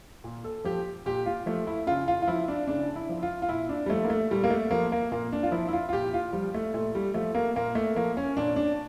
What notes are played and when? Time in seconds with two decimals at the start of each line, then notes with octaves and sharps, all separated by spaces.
0.24 A#2
0.44 A4
0.64 F3 G4
1.06 A#2 G4
1.26 F4
1.46 F3 A3
1.67 E4
1.87 C#3 F4
2.08 F4
2.22 F4
2.28 F3 E4
2.48 D4
2.68 C#3 D4
2.96 E4
3.09 F3
3.23 F4
3.42 F4
3.49 A#2 E4
3.69 D4
3.86 G3
3.89 F3 A3
4.04 A#3
4.10 A3
4.31 A#2 G3
4.44 A#3
4.50 A3
4.71 F3 A#3
4.92 A#3
5.12 A#2 A#3
5.33 D4
5.43 F4
5.52 F3 E4
5.69 E4
5.73 F4
5.89 F4
5.93 A#2 G4
6.14 F4
6.33 F3 G3
6.54 A3
6.74 A#2 A3
6.95 G3
7.14 F3 A3
7.35 A#3
7.55 A#2 A#3
7.75 A3
7.96 F3 A#3
8.17 C#4
8.37 A#2 D4
8.56 D4